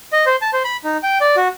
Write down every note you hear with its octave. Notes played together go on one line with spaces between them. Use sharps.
D#5
C5
A5
C5
B5
D#4
G5
D5
F#4